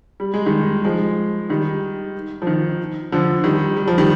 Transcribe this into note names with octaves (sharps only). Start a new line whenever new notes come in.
G3
G#3
D#3 G3
F3 G#3
D#3 G3
F3
D#3
D3 F3
D#3 G3
G3
F3
D#3 G3